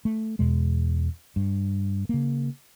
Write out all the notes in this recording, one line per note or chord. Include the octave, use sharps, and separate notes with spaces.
A3
E2 B2 G#3
G2
C#3 A#3